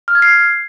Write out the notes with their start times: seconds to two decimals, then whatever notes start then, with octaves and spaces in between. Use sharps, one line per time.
0.08 F6
0.15 G#6
0.22 C7